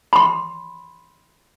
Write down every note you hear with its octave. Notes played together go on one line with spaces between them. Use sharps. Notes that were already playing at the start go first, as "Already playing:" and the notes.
B5 C6